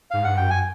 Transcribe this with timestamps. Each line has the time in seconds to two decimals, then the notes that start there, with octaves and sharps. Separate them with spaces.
0.11 G#2 F5
0.24 G2 F#5
0.37 F#2 G5
0.50 G#5